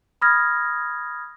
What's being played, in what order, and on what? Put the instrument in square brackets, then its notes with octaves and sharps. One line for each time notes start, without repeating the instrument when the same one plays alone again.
[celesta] B5 D#6 F6 G#6 A#6